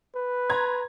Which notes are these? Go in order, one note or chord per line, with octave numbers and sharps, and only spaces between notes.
B4
A#5 C6 G#6